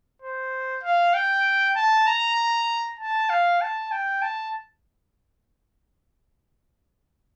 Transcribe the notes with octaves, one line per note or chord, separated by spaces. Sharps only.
C5
F5
G5
A5
A#5
A5
F5
A5
G5
A5